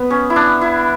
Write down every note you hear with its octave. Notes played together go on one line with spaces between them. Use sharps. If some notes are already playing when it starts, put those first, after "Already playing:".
Already playing: B3
C#4
E4
D4
E4